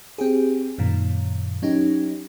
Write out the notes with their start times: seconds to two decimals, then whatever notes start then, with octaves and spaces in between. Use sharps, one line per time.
0.18 C4 G4 G#4
0.78 F#2 A#2 D#3
1.62 F#3 C#4 D#4 G4